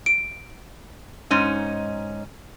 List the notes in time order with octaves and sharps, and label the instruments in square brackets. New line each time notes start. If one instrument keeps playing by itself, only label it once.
[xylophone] D7
[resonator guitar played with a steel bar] G#2 C#4 D#4